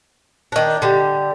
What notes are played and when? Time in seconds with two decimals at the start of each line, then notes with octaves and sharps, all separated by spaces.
0.52 D#3 D4
0.82 D3 G3